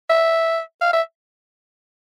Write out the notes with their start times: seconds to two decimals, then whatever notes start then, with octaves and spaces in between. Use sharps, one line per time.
0.10 E5
0.81 F5
0.93 E5